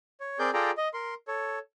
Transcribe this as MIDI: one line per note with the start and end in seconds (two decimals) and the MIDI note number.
0.20 0.39 73
0.39 0.51 60
0.39 0.51 68
0.39 0.51 70
0.39 0.51 74
0.39 0.51 91
0.54 0.71 65
0.54 0.71 68
0.54 0.71 69
0.54 0.71 74
0.54 0.71 79
0.54 0.71 82
0.77 0.88 75
0.94 1.14 70
0.94 1.14 84
1.28 1.59 69
1.28 1.59 73